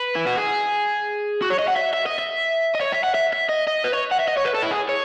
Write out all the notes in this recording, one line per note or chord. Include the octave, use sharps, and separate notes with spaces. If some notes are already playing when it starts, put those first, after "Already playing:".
Already playing: B4
E4
F#4
G#4
F#4
C#5
D#5
F#5
E5
E5
D#5
E5
D#5
C#5
E5
F#5
E5
E5
D#5
D#5
B4
C#5
F#5
E5
D#5
C#5
B4
A4
E4
G#4
C#5